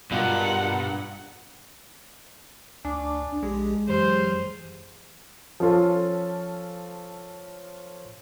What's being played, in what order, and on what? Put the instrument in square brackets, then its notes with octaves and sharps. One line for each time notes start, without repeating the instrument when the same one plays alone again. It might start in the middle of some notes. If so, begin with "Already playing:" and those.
[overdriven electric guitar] G2 [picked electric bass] B2 [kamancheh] F4 A#4 [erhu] F#5
[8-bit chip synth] D2 [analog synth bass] D4 [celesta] G#5 D6
[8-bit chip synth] A#1 G4 G#4 [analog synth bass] G#3
[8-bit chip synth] F#2 E3 F#3 [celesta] G4 [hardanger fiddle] C5
[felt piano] F3 C#4 F4 A4